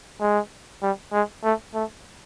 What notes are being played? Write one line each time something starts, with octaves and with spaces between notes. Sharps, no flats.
G#3
G3
G#3
A3
A3